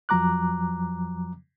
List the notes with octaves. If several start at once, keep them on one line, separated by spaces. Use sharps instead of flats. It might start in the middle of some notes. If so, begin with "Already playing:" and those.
F2 F3 F#3 A#5 D6 F#6